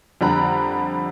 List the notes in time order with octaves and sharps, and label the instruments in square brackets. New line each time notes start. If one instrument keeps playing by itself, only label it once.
[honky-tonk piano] F2 D3 G3 A#5 B5 F#6